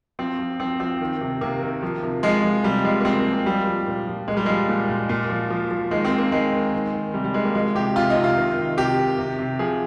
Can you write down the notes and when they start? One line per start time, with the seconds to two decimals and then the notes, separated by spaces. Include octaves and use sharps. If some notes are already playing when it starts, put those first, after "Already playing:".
0.19 F3 C4
0.39 F3
0.60 F3 C4
0.80 F3 C4
1.01 D#3
1.21 C3
1.41 C3 A#3
1.62 D#3
1.82 F3
2.03 C3
2.23 F3 G#3
2.44 F3
2.64 C3 G3
2.84 F3 G#3
3.01 A#3
3.05 C3 C4
3.19 A#3
3.26 F3
3.32 A#3
3.46 F3 G3
3.66 F3
3.87 A#2
4.07 F3
4.28 A#2 G#3
4.37 G3
4.46 F3 G#3
4.69 A#2
4.89 A#2
5.09 A#2
5.30 F3
5.50 F3
5.71 F3
5.91 D#3 G#3
6.05 C4
6.12 D#3
6.18 A#3
6.32 D#3 G#3
6.53 D#3
6.73 D#3
6.93 D#3
7.14 C3 G3
7.24 G3
7.34 D#3 G#3
7.45 A#3
7.54 F3 G#3
7.75 C3 G4
7.96 C3 F4
8.10 D#4
8.16 C3
8.24 F4
8.37 D#3
8.57 D#3
8.77 C3 G4
8.98 D#3
9.18 C3
9.39 C3
9.59 F3 G#4